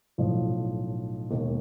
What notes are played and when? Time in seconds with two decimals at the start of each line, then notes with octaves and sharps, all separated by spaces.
0.18 B1 A2 F3
1.30 E1 D#2 D#3